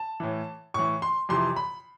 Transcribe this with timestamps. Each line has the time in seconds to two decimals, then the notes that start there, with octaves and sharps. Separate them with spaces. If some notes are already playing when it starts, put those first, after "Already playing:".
Already playing: A5
0.20 A2 E3
0.74 A2 E3 C#6
1.02 C6
1.29 F2 C3 E3 C6
1.56 B5